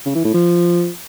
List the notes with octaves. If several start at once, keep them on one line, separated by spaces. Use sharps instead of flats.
C#3
E3
A2
F3